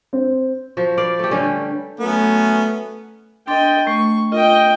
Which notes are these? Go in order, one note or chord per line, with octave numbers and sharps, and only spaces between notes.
C4
F3 F#4
B4 D5 F5
A3 G4
D3 G3 C#4
F#3 A3 B3 C#4
D4 D#5 G5 C6 A6
A3 C#6
F4 D#5 G5